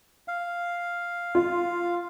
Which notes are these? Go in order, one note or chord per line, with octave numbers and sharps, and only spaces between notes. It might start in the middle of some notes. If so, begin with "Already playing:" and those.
F5
F4